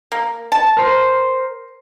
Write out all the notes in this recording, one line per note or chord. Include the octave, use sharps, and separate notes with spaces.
A#3
A5
A#4 C5